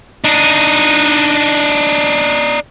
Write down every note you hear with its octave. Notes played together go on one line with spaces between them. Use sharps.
D4 D#4